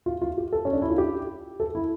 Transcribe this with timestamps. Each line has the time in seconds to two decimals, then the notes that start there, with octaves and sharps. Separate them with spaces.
0.06 F4
0.21 F4
0.38 G4
0.52 A4
0.65 C#4
0.73 D4
0.82 E4
0.90 F4
0.98 G4
1.60 A4
1.75 E4